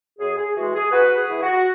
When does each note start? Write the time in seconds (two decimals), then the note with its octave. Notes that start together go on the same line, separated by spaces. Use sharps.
0.19 F#2 G#4
0.38 G#4
0.56 E3 G#3 F#4
0.74 G#4
0.92 G#2 F#4 B4
1.16 G#4
1.28 E3 B3 E4
1.41 F#4